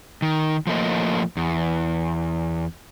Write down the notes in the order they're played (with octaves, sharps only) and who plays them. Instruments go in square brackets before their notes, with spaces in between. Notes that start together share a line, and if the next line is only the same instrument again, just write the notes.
[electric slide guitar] D#3
F3 A3 A#3 D#5
E2